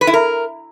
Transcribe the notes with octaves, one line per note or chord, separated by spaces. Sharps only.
B4
E4
A#4